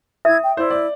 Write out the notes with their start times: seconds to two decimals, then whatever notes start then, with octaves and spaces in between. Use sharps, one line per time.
0.25 E4 E5 D#6 G#6
0.43 G5
0.57 E4 C5 D5
0.71 D5